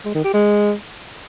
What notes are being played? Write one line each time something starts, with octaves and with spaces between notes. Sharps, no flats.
G#3
D#3
G4
G#3